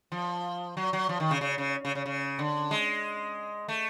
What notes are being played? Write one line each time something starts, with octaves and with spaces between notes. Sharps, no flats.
F3
F#3
F#3
F3
D#3
C#3
C#3
C#3
C#3
C#3
C#3
D3
G#3
A3